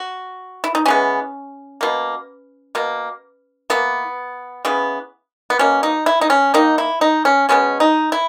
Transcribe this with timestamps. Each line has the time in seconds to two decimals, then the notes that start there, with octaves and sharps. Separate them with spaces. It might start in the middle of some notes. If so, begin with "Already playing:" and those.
Already playing: F#4
0.64 E4
0.75 D#4
0.86 E3 G#3 B3 C#4
1.81 B2 A#3
2.75 B2 A#3
3.70 E3 A#3 B3
4.65 C#3 E3 B3
5.50 B3
5.59 B2 A#3 C#4
5.83 D#4
6.06 E4
6.21 D#4
6.30 C#4
6.54 D#3 A#3 D#4
6.78 E4
7.01 D#4
7.25 C#4
7.49 B2 G#3 B3 C#4
7.80 D#4
8.12 E4